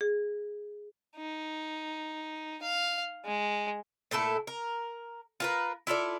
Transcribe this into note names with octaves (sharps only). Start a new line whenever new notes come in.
G#4
D#4
F5
G#3
A#2 A3 E4 A4
A#4
F4 A#4 B4
E4 F4 A4 D5